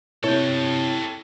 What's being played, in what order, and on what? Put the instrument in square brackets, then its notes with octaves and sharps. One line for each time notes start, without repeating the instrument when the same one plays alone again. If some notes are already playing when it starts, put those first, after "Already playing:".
[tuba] C3 [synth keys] E4 [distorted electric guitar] A4 G5 [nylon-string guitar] C#5